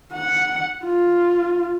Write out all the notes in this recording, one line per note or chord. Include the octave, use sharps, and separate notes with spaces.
F#5
F4